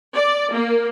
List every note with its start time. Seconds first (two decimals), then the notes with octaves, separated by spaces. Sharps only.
0.14 D5
0.53 A#3